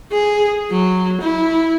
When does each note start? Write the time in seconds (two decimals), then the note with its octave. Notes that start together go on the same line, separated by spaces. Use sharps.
0.12 G#4
0.70 F#3
1.20 E4